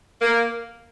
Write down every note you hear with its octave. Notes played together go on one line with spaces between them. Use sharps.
A#3